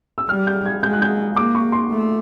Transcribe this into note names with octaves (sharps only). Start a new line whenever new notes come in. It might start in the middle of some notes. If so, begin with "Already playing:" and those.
E6
G3 F6
G6
G#6
G#3 G6
F#6
G6
A#3 D6
C#6
C6
A3